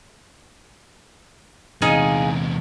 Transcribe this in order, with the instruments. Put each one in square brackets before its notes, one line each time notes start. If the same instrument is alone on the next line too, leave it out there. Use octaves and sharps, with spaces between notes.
[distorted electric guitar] E2 C3 [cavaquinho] D#4 G#4 F5